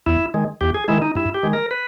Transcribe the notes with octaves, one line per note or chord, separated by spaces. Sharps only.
E2 E4
D#3 G#3
E2 G4
G#4
D#3 G#3 E4
D#4
G2 E4
G4
D#3 G#3
A#4
B4